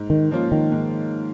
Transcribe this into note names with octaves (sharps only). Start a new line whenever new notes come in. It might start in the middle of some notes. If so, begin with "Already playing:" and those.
Already playing: G#2
D#3
F3 A#3 C#4 F4
D#3
G#2